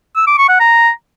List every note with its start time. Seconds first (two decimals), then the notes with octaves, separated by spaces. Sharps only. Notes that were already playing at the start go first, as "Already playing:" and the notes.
0.16 E6
0.27 D6
0.38 C#6
0.49 F#5
0.60 A#5